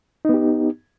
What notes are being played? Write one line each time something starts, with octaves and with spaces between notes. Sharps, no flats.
B3 D#4 G4